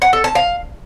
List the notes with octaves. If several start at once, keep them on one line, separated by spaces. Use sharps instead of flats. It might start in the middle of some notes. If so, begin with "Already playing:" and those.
F#5
A4
A5
F5